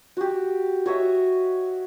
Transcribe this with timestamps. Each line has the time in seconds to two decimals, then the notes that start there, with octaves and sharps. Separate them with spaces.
0.17 F#4 G4
0.86 F#4 C#5 D#5 E5